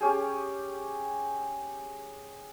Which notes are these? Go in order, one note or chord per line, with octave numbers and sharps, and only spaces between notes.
C#4 G4 G#4